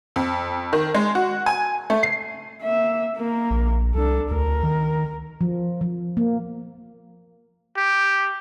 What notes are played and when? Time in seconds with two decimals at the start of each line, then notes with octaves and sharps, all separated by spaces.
0.16 F2
0.73 D#3
0.94 G#3
1.15 F#4
1.46 G#5
1.90 A3
2.03 C7
2.63 A#3 E5
3.15 A#3 A#4
3.50 A#1
3.95 C2 D4 A4
4.31 D2 A#4
4.63 D#3
5.41 F3
5.81 F3
6.17 A#3
7.77 G4